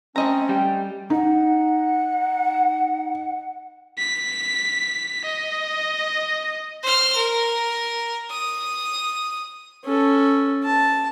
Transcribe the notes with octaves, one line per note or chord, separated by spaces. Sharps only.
A3 C4 C#4 D#5 A#5
G3 G5
D#4 F#5
B6
D#5
C5 F6
A#4
D#6
C#4 A4
A5